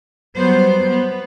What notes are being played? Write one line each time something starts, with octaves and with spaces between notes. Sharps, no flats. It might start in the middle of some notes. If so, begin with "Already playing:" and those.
F#3 G3 B3 C5
B3